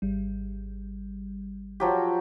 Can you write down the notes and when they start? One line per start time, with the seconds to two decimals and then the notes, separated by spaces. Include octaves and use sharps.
0.02 G#1 G3
1.80 F3 F#3 G4